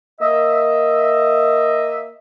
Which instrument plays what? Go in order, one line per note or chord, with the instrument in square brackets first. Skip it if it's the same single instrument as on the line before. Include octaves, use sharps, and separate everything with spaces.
[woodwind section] A#3 D#5 E5